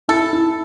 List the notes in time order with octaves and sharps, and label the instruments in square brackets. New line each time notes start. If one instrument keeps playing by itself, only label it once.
[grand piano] E4 [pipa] A4
[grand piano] E4